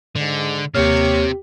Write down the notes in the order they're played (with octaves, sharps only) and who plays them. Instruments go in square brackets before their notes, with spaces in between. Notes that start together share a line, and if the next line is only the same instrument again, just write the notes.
[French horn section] G#2 [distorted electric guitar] D3
[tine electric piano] D#2 A#3 F6 [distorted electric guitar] C3 [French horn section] G4 [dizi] C#5